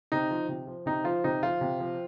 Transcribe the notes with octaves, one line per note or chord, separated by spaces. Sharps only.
C3 D#4
F3
C3
F3
C3 D#4
F3 F4
C3 D#4
F3 F4
C3
F3